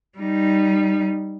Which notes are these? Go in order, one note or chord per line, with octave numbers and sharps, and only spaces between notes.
G3 D#4